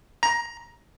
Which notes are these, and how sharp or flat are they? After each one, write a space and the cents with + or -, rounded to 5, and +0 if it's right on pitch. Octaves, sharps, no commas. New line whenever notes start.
A#5 +15